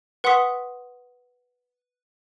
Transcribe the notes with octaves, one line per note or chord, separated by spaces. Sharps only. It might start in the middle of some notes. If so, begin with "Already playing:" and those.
B4 F#5 C6 C#6 D#6 B6